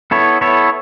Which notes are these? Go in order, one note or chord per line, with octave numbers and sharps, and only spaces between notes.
B3 E4 A4 C#5
B3 E4 A4 C#5